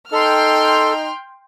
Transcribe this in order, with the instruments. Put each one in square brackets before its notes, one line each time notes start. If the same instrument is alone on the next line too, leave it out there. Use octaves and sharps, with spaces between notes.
[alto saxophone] D#4 [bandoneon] A4 [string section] G5 C6 F6